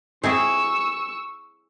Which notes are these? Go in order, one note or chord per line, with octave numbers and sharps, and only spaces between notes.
C4 E4 G#4 G#5 C#6 E6